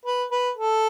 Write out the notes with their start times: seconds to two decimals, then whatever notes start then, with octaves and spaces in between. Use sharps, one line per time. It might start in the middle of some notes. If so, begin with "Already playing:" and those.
0.06 B4
0.32 B4
0.57 A4